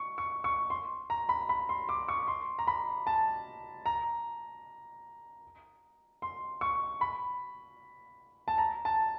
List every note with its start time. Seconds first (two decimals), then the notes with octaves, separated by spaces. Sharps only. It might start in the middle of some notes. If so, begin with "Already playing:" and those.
Already playing: C#6
0.18 C#6
0.44 C#6
0.70 C6
1.10 A#5
1.29 B5
1.49 B5
1.69 C6
1.89 D6
2.08 C#6
2.28 C6
2.59 A#5
2.67 B5
3.07 A5
3.86 A#5
6.22 C6
6.61 C#6
7.01 B5
8.48 A5
8.58 A#5
8.85 A5